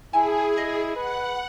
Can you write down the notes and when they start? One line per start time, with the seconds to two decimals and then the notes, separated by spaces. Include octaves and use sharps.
0.13 E4 G#4 E5 G#5 A5
0.57 D#5
0.96 B4 F#5